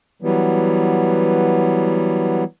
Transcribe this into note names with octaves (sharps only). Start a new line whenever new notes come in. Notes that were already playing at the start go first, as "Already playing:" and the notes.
E3 F#3 G3 B3